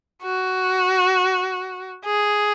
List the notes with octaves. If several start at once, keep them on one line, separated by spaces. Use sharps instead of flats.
F#4
G#4